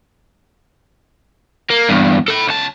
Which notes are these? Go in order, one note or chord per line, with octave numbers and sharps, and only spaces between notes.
A#3
E2 G2
A4 B5
C#2 A5